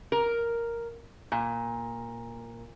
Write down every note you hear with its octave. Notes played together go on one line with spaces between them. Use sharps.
A#4
A#2